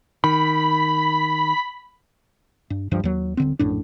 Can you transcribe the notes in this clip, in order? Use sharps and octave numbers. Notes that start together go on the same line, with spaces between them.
D#3 B5
G2
D1 G2 F3
D#2 F#3
D#1 D3 C4
A#1 F#2 A2 D4